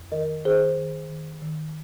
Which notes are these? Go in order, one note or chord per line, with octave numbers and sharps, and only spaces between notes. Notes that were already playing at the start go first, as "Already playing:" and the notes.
Already playing: F2
D#3 A#4 D#5
D#3 G#4 C5
D#3
D#3
D#3